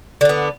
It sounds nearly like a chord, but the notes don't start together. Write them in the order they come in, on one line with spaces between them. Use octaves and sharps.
D3 D4 B3